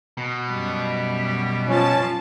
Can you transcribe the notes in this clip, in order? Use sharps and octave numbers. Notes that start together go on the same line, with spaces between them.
B2
F#2 G3
F3 C#4 A5